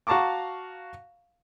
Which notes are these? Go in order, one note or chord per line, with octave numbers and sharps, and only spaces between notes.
F#4 F5 A5 A#5 C#6 D6